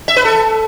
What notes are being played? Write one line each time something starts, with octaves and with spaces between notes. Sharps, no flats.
E5
B4
A4